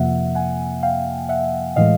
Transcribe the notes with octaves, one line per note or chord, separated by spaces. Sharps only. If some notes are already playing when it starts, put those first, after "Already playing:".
Already playing: F2 C3 F3 A#3 E5 F#5
F#5 G#5
F5 G5
E5 F#5
A2 E3 G#3 D#5 F5